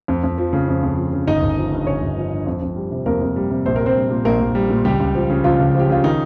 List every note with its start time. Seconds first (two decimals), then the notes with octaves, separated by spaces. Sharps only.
0.08 F2
0.23 F2
0.38 F3
0.53 C#3
0.68 F2
0.83 F2
0.97 F3
1.13 C#3
1.27 G1 D#4 D#5
1.42 G1
1.57 F3
1.72 G2
1.87 G1 C#4 C#5
2.02 G1
2.17 F3
2.32 G2
2.47 F2
2.62 F2
2.76 G3
2.91 C3
3.06 F2 A#3 A#4
3.22 F2
3.36 G3
3.51 C3
3.66 A#1 C5
3.76 A#1 A#4
3.86 C4 C5
3.96 G3
4.11 A#2
4.25 A#1 A#3 A#4
4.40 A#1
4.55 G3
4.70 A#2
4.85 C#2 G3 G4
5.00 C#2
5.15 F3
5.30 C#3
5.44 C#2 F3 F4
5.60 C#2
5.75 F3 G4
5.89 C#3 F4
6.04 D#3 D#4